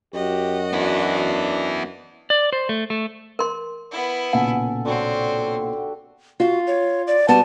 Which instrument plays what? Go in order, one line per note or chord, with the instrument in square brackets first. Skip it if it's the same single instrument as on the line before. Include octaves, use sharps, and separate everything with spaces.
[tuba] F#2 [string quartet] F#4 D#5 [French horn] G4
[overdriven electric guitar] B3 E4 [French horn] D4
[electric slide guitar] D5
C5
A3
A3
[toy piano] A#4 C6
[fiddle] B3 E4
[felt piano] B1 A#2 C#3 [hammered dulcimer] A4 G#5 [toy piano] F#5
[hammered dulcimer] D3 F#4 G4 [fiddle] C4 C#4
[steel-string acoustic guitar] F4 [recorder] F#4
[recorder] C#5
D5
[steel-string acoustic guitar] G3 B3 F#4 [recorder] A5